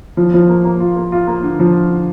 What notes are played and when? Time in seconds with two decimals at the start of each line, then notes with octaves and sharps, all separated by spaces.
0.17 F3
0.34 F3
0.49 A#3
0.65 A#3
0.80 F4
0.96 A#3
1.12 F4
1.27 A#3
1.43 D3
1.60 F3
1.75 D3
1.90 D3